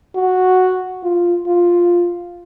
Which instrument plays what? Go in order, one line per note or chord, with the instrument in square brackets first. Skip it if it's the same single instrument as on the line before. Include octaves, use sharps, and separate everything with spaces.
[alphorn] F#4
F4
F4